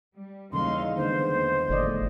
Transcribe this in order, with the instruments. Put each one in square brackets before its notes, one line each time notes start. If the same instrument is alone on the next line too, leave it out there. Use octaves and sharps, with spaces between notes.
[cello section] G3
[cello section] D#2 D#4 F5 [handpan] C#3 E3 G3 [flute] C6
[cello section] E2 [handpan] D3 D#3 G#3 [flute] C5
[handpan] A#3
[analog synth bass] G1 [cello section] A2 F3 [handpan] A3 D5 D#5